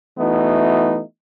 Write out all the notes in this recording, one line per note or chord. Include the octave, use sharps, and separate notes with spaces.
E3 A3 B3 D#4 E4 F#4